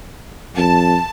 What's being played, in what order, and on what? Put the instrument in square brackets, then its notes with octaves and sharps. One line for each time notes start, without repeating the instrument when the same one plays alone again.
[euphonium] F2 [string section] A5